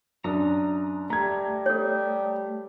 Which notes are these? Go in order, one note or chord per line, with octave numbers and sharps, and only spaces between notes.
F#2 D4 A#5 D#6
G3 A3 A#5 G#6
A4 C#5